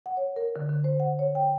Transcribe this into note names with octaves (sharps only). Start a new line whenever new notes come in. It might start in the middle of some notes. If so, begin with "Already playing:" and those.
F#5
C#5
A#4
D3
D3
C5
F#5
C#5
G5